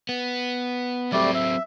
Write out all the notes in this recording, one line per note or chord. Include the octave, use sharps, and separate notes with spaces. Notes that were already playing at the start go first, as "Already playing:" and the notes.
B3
F#3 G3 A3 C4 D5
E5